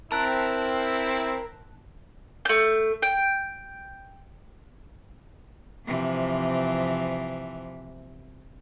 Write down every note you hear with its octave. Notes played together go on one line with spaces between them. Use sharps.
C4 E4 A#4 A5 F#6
A3 G6
G5
C3 E3 F3